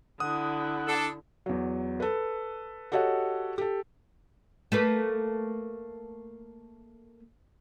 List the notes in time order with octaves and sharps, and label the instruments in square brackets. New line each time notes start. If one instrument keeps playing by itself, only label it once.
[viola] D3 E4 [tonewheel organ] F#5 [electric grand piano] D#6
[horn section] D4 A4
[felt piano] E2 F#3
A4 B4
F#4 G4 A4 C#5 D#5 F#5
G4 A4
[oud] A3 A#3 B4